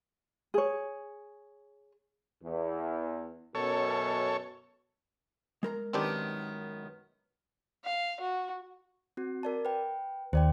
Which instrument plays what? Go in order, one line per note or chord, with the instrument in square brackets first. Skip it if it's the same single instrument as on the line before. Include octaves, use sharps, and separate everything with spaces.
[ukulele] G#4 C#5
[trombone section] E2
[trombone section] F#2 B2 [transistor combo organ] A4 C#5
[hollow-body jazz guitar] G#3 A#4 A#5
[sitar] F#2 D#3 B3 [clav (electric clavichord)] C4 D4 G4
[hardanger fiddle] F5
F#4
[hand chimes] C4 F#4
A#4 D5 A5
B4 G5
[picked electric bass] D#2 [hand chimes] C5 D5 G5